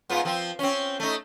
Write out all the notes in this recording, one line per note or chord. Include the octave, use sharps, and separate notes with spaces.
G#2 B3 F4
F3 C4
C4 C#4
A3 D#4